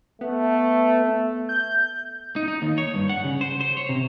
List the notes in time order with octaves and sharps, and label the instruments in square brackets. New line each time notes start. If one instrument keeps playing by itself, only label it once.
[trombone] A3 [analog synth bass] B3
[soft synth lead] G6
[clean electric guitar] D#4
D#4
D#2
C#5
G2
F#5
C#3
C5
C5
C#5
C3